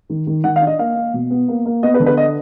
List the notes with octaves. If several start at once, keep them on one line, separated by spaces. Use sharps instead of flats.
D#3
D#3
D#3 F#5
F5
D4
D#5
A#3 F5
A#3
B2
B3
A#3
A#3
B3 D#5
B4
D3
B4
D#5